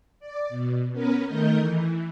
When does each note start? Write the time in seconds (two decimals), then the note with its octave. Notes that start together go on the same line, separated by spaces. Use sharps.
0.20 D5
0.49 B2
0.92 B3 C#4 A#4 B4
1.26 D#3 A3 A#4 D#5 G6
1.59 E3